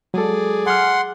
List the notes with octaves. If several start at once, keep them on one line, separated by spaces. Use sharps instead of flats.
F#3 G#3 G#4 A4 D5
F#5 G#5 C6 F6